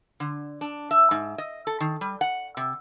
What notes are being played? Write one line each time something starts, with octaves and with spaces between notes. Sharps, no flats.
D3
D4
E5
G#2
D#5
A4
D#3
G3
F#5
C3